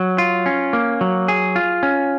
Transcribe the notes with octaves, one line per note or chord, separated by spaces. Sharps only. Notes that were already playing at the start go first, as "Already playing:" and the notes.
Already playing: F#3
F4
C#4
A#3
F#3
G#4
F4
C#4